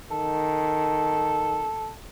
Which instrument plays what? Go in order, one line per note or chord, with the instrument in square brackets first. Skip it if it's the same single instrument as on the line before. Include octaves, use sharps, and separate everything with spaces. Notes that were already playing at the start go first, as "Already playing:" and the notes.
[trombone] D#3 [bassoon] A4